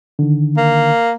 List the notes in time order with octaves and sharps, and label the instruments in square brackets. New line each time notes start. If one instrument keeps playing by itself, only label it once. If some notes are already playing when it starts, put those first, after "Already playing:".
[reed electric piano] D3 D#3
[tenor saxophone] A#3